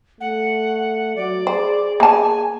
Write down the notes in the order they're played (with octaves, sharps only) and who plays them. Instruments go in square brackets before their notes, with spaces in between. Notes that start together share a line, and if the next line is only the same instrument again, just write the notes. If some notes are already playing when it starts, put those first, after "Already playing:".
[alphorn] A3 [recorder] F#5
[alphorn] F#3 [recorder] D5
[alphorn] G#4 [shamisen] C5
[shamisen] A#3 A5 [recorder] G#5